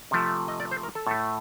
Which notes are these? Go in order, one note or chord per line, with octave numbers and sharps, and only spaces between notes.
C3 F3 A3
D#5
D5
C5
A#4
A4
A2 A3